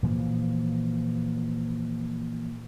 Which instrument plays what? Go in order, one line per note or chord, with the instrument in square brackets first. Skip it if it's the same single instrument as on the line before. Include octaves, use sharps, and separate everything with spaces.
[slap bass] A#2 E3 F3